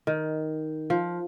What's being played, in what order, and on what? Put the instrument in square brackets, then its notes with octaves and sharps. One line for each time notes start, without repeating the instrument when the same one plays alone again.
[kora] D#3
F3